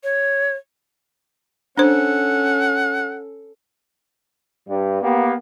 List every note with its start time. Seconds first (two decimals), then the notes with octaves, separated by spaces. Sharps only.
0.03 C#5
1.78 C#4 D4 A4 C5 F#5
4.69 G2
5.02 A#3 B3 G4